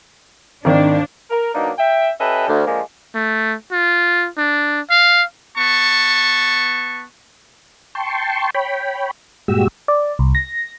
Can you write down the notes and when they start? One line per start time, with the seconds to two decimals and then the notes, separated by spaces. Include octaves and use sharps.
0.65 G#1 D#3 D4
1.31 A#4
1.55 B2 F#3 A#3 D4 D#4
1.78 E5 G5
2.20 C#4 G4 A4 B4 D#5 E5
2.49 D2
2.67 D3 F3 G#3 A#3
3.15 A3
3.72 F4
4.37 D4
4.90 F5
5.58 B3 A5 C#6
7.95 G5 A5 C6 C#6
8.55 C#5 G5 B5
9.48 G2 A#2 G#3 F#4 G4 E6
9.88 D5
10.19 C2
10.35 A#6